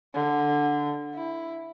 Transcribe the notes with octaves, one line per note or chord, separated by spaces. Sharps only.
D3
E4